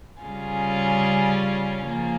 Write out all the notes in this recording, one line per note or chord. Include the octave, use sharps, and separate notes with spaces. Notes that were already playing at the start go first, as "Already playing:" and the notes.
C#3 G3 C#4 F4 G#4
C#3 F3 A#3 F4 G#4